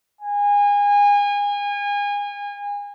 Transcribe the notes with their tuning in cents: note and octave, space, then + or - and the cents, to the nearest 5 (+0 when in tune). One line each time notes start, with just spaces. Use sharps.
G#5 -30